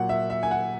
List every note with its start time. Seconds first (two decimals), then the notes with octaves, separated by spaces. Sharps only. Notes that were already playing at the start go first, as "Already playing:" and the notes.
Already playing: A#2 F#3 F#5
0.09 E5
0.30 E5
0.43 G#5
0.51 F#5